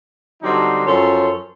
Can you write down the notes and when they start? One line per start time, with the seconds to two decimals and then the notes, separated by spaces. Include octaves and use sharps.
0.42 D3 F#3 G3 C4 D4 D#4
0.87 F#2 F3 A4 C#5 C6